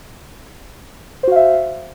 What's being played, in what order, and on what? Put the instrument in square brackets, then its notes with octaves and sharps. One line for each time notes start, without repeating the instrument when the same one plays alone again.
[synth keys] C5
F#4
F5
E5